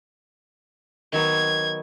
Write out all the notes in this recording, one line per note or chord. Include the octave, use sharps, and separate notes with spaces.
D#3 F#3 B3 G#6